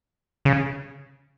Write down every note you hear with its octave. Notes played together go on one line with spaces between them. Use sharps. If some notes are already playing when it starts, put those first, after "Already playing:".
C#3